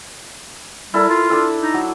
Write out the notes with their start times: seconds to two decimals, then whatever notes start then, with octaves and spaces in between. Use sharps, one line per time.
0.94 G3 E4 A4 A#4
1.09 F4
1.30 D4 A4 E5
1.60 D#4
1.74 F#3